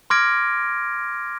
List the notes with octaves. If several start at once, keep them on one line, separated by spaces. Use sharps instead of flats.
C6 D6 F6 G#6 A#6 D7